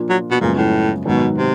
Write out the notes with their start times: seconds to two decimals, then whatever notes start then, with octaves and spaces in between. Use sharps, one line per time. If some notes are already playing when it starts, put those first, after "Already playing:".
Already playing: A#2 F3 A#3 D4 F4
0.09 F#3
0.31 B2
0.41 F#2 A#2 C#3 F3 G#3 B3
0.57 A2
1.05 G#2 B2 D#3 F#3 B3
1.38 C3